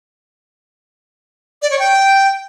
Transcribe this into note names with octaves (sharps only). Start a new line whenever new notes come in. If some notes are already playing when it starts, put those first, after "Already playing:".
D5
C#5
G5